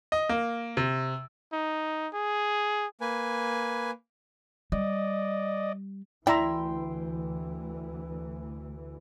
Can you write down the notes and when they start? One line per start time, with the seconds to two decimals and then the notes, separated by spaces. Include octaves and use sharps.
0.12 D#5
0.29 A#3
0.77 C3
1.53 D#4
2.14 G#4
3.01 A#3 B4 G#5
4.72 G3 D5 D#5
6.27 D2 E3 E4 D5 E5 G5 A#5 C6